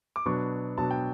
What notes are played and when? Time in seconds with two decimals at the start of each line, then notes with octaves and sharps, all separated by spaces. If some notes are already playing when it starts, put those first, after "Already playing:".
0.16 D6
0.25 B2 F#3 B3 D4 C#6
0.78 B2 F#3 B3 D4 A5
0.91 G5